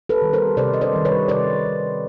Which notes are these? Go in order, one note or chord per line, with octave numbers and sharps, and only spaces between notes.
A4 B4
D#3 G3
A#4 C5
C3 C5 D5
D#5
C5 D5
D#3 G3
B4 C#5
C3 C5 D5
D#3 G3